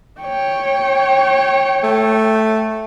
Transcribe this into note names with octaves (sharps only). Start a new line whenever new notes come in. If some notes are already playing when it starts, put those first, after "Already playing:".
C#5 G5
A3